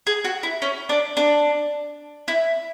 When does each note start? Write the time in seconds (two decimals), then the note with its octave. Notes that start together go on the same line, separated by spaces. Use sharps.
0.07 G#4
0.25 F#4
0.43 E4
0.62 C#4
0.89 D4
1.17 D4
2.28 E4